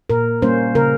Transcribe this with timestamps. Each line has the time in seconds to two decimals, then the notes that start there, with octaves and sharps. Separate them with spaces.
0.10 A#2 A#4
0.42 G3 A#3 C#4 C5
0.75 C#3 A#4